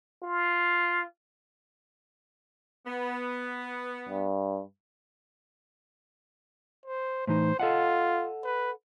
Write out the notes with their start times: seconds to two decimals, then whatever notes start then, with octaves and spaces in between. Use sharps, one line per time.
0.23 F4
2.86 B3
4.09 G2
6.86 C5
7.27 A2 E3 D#4 C5
7.60 F4 A4 D#5 F#5
8.44 B4